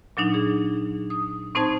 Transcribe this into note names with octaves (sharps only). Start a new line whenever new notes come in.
A#2 F#3 D4 D#4
G#4
D#6
A2 C4 D#4 C5 A5 G#6